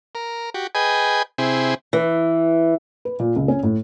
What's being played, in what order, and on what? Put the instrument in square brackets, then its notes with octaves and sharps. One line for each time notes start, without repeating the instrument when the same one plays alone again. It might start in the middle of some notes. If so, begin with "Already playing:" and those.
[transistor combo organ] A#4
F#4 G4
G#4 B4 D#5 G5 G#5
C3 C4 E4 G#4
[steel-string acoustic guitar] E3
[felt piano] B4
A#2
C#2
C#4
A2